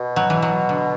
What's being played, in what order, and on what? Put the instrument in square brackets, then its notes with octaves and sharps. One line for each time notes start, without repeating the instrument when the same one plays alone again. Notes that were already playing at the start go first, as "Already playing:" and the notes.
Already playing: [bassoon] B2
[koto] F#3
E3
F#3
D3